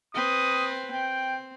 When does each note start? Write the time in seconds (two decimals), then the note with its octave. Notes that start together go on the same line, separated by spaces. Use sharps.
0.15 C4 B4 D#6
0.91 C4 G5